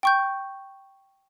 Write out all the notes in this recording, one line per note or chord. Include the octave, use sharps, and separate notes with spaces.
G5 C#6 G6